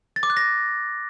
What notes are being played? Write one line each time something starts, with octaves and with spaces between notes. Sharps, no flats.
A6
D6
F#6
A#6